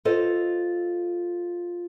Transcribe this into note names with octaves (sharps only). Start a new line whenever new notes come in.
F4 A4 C5 D#5